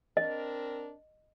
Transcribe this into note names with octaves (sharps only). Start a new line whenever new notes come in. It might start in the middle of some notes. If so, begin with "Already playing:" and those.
C4 D4 A#4 D#5